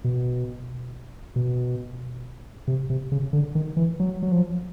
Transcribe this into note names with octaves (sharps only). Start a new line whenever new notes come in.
B2
B2
C3
C3
C#3
D3
D#3
E3
F#3
F#3
F3